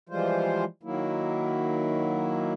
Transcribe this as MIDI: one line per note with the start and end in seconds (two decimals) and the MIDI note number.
0.09 0.65 52
0.09 0.65 53
0.09 0.65 55
0.09 0.65 56
0.09 0.65 65
0.09 0.65 72
0.83 2.53 51
0.83 2.53 54
0.83 2.53 58
0.83 2.53 64